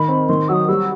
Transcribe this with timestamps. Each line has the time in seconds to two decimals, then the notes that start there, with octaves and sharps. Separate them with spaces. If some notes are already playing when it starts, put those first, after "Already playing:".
Already playing: D#3 B5
0.08 C4
0.29 D#3 C6
0.48 F#3 D#6 E6
0.68 G3 E6